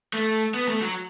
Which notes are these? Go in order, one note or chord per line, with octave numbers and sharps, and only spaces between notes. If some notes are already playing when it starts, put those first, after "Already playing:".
A3
B3
A3
F#3